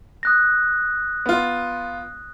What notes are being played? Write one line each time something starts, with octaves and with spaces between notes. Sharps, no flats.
D#6 F#6 A#6
B3 F4